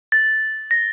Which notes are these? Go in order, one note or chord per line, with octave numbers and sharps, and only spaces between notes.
A6
A#6